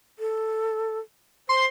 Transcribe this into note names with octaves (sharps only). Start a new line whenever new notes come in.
A4
C5 C6